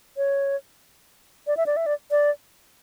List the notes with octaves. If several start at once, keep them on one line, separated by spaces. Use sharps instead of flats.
C#5
D5
E5
D5
E5
D5
D5